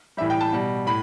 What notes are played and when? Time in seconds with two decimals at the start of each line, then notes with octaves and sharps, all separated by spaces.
0.17 A2 E3 G3 E5
0.30 G5
0.41 A5
0.52 B2 G3
0.86 A2 B5